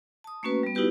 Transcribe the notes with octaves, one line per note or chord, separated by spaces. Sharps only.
A5 D#6
A3 A#3 C#4 F#4 B4
G3 B3
B3 D#4 E4 F#4 G4 B4